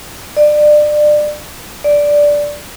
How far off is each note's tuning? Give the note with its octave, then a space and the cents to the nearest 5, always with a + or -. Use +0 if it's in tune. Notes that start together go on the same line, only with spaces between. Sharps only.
D5 +25
D5 -5